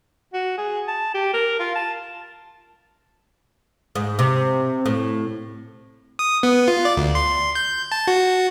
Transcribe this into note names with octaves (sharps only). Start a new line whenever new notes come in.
F#4
G#4
A5
G4
A#4
F4
A5
G#2
C3
A2
D#6
B3
F4
D5
D2
C6
G6
A5
F#4